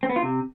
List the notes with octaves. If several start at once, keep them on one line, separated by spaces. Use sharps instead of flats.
C4
B3
F4
C3